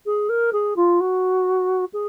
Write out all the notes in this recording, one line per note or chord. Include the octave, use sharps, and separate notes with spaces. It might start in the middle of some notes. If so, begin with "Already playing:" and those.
G#4
A#4
G#4
F4
F#4
G#4